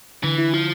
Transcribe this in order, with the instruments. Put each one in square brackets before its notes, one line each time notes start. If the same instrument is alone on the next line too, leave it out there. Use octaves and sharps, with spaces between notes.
[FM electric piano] D3 [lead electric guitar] E3
[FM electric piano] E4
[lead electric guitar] F3 [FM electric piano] E4